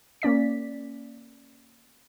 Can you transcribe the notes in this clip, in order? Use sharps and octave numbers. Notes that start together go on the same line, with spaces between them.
A#3 C#4 D5 B6